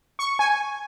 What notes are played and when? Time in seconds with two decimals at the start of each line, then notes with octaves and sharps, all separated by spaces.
0.19 C#6
0.39 G#5